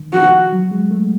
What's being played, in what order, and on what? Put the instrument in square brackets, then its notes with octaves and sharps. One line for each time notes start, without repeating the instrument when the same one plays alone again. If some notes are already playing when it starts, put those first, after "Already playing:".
Already playing: [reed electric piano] D#3
[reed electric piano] F3 [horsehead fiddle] F#4
[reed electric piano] F#3
G#3
A3